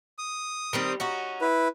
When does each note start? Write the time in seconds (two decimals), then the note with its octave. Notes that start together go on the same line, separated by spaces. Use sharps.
0.18 D#6
0.73 D#3 G3 C4
1.00 C#4 D#4 F#4
1.41 E4 B4